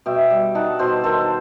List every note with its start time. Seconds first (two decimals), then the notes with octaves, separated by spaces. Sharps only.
0.06 B2 E5 G5
0.30 G3
0.55 D#4 F#5 A5
0.79 B2 A4 C5
1.04 D#3 A4 C5